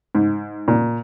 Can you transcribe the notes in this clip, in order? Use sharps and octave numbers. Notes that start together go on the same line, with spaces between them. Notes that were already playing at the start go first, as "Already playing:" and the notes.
G#2
A#2